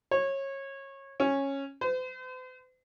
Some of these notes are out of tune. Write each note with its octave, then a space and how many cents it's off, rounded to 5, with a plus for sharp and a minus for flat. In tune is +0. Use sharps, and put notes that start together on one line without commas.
C#5 -25
C#4 -10
C5 -45